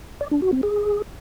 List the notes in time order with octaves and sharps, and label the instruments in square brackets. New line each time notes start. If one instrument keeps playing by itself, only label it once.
[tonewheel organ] D5
D4
F#4
C4
G#4